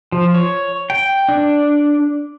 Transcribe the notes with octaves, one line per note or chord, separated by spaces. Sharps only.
F3
C#5
G5
D4